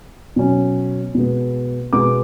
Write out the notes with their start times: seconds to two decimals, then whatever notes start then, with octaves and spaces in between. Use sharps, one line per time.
0.36 B2 F#3 C#4
1.15 B2 G#3 B3
1.93 B2 G#3 B3 D6